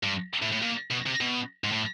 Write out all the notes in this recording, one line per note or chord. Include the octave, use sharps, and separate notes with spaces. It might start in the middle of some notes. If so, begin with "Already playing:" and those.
G2
A2
A2
A#2
B2
C3
B2
G#2
A2